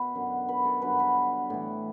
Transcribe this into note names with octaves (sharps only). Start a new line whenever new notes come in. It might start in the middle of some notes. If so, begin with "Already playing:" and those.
Already playing: B2 B4
F#2 D3 F#3
B4
A4
G2 D3 F#3 B4
B4
A2 E3